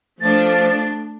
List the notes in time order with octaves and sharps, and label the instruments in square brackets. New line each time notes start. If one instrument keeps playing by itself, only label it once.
[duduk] F3 [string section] A3 D4 [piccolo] A6